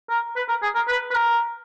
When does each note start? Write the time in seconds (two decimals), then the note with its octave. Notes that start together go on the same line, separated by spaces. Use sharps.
0.10 A#4
0.36 B4
0.48 A#4
0.63 G#4
0.75 A#4
0.88 B4
1.11 B4
1.14 A#4